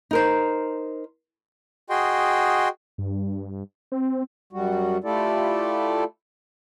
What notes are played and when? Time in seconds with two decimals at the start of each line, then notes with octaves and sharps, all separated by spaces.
0.11 D#4 A#4 C5
1.90 F#4 G#4 D#5 G5 C6
2.98 G2
3.92 C4
4.53 F#2 G3 F#4
5.04 A3 E4 F4 G4 A4 D5